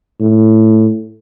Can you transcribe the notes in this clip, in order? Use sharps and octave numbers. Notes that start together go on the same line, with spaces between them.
A2